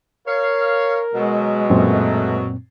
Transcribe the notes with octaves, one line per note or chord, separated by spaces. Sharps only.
A#4 C#5 F5
B2 F#3 G#3
F#2 A#2 A3 C4